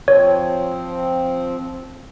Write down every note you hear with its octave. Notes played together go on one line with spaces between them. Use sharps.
F3 C4 C#5